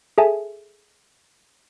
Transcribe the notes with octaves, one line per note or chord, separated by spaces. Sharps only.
G#4 A4 E5 G#5 A5